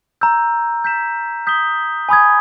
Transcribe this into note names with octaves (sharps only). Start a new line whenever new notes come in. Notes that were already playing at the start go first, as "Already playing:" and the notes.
A#5 E6 G6
G6 B6 E7
D#6 G6 B6 G7
G#5 B5 D#6 G#6